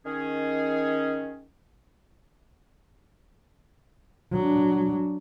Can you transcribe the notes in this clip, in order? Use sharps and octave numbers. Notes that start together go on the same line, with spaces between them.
D#3 C#4 G#4
F#3 D4